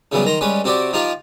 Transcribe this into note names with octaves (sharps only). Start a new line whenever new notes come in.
C#3 E3 F#3 G3 B3
D#3 A#5 C6
G3 G#3 C#4 B4
C3 C4 F#4 G4 D5 D6
F3 D#4 F4 G4 F5